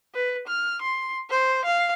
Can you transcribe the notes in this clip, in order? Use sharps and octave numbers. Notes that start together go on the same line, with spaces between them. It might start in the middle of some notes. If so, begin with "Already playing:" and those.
B4
F6
C6
C5
F5